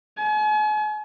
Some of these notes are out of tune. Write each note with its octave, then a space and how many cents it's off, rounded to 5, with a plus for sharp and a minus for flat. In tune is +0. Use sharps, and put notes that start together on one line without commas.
G#5 +40